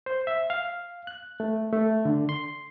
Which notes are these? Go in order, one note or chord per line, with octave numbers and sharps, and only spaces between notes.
C5
E5
F5
F#6
A3
A3
D3
C6